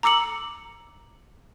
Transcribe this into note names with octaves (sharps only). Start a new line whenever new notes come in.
A#5 D6 E6 C#7 F#7